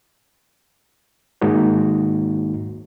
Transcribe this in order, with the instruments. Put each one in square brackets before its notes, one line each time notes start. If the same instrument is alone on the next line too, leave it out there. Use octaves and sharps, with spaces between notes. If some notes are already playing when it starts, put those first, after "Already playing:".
[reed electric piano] G#2 D#3 G#3 A#3 D#4 F#4